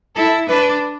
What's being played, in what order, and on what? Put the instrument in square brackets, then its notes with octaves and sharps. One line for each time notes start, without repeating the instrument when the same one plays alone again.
[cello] E4 [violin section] A4
[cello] D4 [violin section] B4